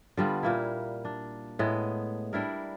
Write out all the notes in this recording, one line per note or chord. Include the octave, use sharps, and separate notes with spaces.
D3 G3 B3 F4
A#2 A#3 E4
D4
A2 G#3 B3
G3 D4 E4 A#4